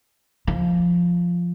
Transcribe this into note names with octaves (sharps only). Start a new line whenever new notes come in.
F3